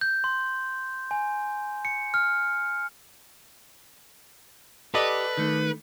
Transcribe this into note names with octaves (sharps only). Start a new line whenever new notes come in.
G6
C6
G#5
C#7
F6
G4 A4 B4 D5 D#5
D#3 A3